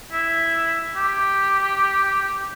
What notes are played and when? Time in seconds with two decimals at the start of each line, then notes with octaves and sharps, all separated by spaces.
0.13 E4
0.96 G4